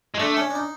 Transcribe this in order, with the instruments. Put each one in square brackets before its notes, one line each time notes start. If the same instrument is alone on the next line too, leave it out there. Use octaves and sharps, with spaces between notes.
[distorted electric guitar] G#3
[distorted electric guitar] A3 [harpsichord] D4
[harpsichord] C#4
D4
D#4